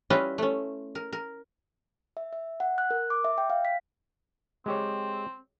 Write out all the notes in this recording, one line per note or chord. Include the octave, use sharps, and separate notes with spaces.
G3 C#4 E4 F4 B4 D#5
A3 C#4
A#4
A#4
E5
E5
F#5
F#6
A#4
D6
E5
G5
F5
B6
G#3 C4 G4 C#5